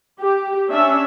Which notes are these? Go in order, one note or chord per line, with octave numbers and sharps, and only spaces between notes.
G4
C#4 D4 E5